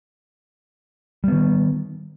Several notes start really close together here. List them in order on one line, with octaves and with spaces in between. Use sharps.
G3 B3 D#3